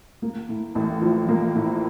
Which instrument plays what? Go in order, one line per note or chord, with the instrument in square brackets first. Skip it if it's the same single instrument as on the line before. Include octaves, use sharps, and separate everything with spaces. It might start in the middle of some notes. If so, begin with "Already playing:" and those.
[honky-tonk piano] A#3
A2
A1
F3
A#3
A2